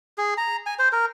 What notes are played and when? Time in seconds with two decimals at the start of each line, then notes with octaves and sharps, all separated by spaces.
0.18 G#4
0.37 A#5
0.66 G#5
0.79 C5
0.92 A#4